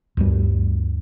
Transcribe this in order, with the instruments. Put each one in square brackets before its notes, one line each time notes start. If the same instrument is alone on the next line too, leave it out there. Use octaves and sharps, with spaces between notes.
[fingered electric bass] D2 G2 G3